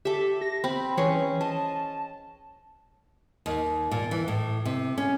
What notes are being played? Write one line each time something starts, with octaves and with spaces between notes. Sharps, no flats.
G4 A4 E5
A#6
C4 B5
E3 C#4 G#4 C#5
D#5 A5
D#2
A#2
E3
A2
C3
C#4